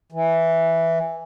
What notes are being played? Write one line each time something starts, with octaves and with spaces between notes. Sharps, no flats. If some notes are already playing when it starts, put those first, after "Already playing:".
E3